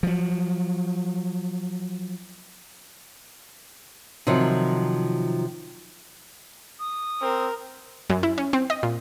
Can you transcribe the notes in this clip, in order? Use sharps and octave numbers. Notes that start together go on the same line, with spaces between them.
F3 F#3
C3 D#3 F3 F#3
D#6
C4 A#4
F#2
E4
C#4
C4
D#5
A#2